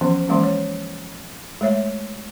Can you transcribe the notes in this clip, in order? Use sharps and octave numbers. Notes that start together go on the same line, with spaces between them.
E3 F3 B3 C#4
E3 F#3 G#3 A#3 C#4
C#5
G#3 A3 C#5 E5